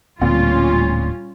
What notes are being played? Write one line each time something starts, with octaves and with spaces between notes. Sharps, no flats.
D1 D2 A#2 G3 C4 C#4 F4